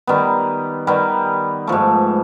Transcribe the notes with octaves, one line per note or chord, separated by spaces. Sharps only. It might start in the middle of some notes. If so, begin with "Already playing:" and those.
D#3 G3 B3
D#3 G3 B3
G#2 F3 A3